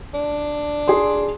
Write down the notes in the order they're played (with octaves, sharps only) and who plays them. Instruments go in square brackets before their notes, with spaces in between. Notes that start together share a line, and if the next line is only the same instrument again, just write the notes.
[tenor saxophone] D4
[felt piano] G#4 C6